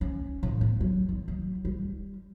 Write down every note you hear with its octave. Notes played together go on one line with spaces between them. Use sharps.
C#4
A2
B3
F#3
D#3
F#3
G3